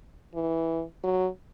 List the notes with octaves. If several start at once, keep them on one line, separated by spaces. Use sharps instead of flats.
E3
F#3